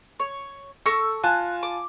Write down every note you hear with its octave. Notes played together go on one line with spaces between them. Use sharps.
C#5
A4 C#6 E6 A#6 C#7
F4 G#5 A5 F#6
D6